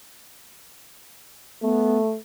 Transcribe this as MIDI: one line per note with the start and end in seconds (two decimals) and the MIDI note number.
1.62 2.16 57
1.62 1.99 59